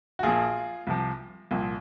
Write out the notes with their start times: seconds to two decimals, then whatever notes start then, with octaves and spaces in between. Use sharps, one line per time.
0.19 F#4
0.23 A#1 A#2 F3 F4 G#4
0.87 C2 C3 F3
1.51 C2 A#2 F3